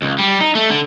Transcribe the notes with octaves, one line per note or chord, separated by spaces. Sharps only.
C#2
G3
D#4
A3
D3